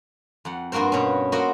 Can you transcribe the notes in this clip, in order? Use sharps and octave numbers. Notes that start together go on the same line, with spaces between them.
F2 F#5
G2 A#3 F#4 A#4 C5
B2 C#4
A#3 F#4 A#4 C5 D#5 F#5